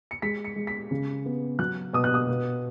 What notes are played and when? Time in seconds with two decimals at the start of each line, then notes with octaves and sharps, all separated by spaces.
0.11 C#7
0.22 G#3 B6
0.45 C#7
0.56 G#3
0.67 B6
0.91 C#3
1.26 B3
1.59 F#3 F#6
1.93 B2 D#6
2.04 F#6
2.14 D#6
2.28 B2